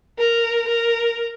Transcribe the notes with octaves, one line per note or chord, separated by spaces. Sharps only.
A#4
A#4